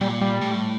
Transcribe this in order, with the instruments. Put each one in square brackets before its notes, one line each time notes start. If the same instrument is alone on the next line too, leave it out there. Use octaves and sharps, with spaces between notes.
[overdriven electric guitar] A#2 [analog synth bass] G3
[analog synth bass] G3
[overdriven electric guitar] A2